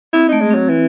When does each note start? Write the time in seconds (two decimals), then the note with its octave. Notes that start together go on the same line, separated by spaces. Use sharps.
0.13 C4 E4
0.28 A3 D#4
0.41 G#3
0.50 F#3 C4
0.69 E3